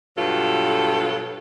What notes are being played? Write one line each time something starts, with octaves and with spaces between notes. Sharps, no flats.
G2 B2 F#3 F4 A4